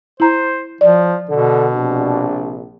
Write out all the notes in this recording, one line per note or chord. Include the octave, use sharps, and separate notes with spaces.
E4 C5 A#5
F3 D5
B2 D3 A4
A#1 C3 D4